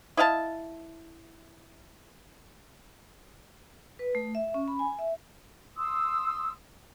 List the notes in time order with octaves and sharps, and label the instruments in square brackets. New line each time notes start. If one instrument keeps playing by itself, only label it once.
[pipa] E4 D#5 F5 A5
[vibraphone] B4
A3
E5
C#4
B5
G#5
E5
[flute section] C6 D#6 E6